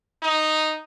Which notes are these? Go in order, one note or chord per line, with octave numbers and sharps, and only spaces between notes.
D#4